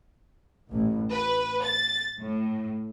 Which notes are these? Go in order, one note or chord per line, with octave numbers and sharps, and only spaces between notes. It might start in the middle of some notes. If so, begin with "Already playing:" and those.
A1
B4
A6
A2